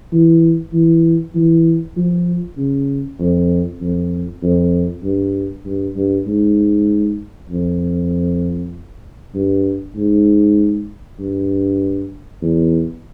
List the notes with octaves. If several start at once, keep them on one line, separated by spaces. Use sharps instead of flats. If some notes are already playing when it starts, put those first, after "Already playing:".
E3
E3
E3
F3
C#3
F2
F2
F2
G2
G2
G2
G#2
F2
G2
G#2
G2
E2